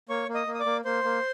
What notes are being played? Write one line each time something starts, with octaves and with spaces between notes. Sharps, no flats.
A#3 C#5 C#6
A#3
D#5 D#6
A#3
D#6
D5 D6
A#3
A#3 C5 C6
A#3